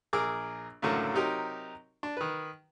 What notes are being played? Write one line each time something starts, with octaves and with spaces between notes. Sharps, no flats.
A#1 G#4 A#4 D6 E6 F6
C#2 F#2 A2 D3 A#4
C3 F#3 D#4 G4 A#4
D4
D#3 B4